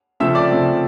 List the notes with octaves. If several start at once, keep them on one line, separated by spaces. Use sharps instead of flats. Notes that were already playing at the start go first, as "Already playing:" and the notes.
C#3 F3 A3 C4 E5 E6
D5 D6
C#3 F3 A3 C4